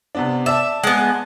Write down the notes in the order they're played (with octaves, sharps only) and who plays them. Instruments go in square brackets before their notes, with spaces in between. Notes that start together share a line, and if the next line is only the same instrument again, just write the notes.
[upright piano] C3 B3 D4
[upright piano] D5 A5 [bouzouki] E5
[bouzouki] G#3 B3